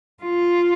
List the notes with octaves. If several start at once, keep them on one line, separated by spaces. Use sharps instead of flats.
F4